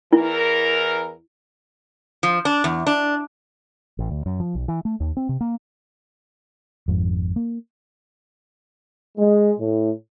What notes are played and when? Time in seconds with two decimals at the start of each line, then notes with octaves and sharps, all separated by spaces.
0.13 E2 E3 E4 A#4
2.23 F3
2.45 D4
2.64 E2
2.87 D4
3.99 A1
4.11 D2
4.26 F#2
4.40 F3
4.55 B1
4.68 E3
4.85 A3
5.00 D#2
5.17 C4
5.29 C3
5.41 A#3
6.88 G#1 F2 G#2
7.36 A#3
9.18 G#3
9.59 A2